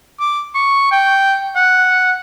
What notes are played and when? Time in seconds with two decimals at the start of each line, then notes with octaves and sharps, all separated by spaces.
0.20 D6
0.55 C#6
0.92 G5
1.56 F#5